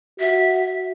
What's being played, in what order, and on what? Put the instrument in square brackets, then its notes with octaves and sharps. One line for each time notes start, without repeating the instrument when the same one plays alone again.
[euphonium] F#4 [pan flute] E5